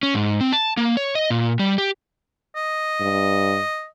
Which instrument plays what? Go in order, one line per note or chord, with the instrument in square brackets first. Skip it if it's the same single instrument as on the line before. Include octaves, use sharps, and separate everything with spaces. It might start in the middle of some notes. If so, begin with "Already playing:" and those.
[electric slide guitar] C#4
G#2
C4
A5
A#3
C#5
D#5
A#2
G3
G4
[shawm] D#5
[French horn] G2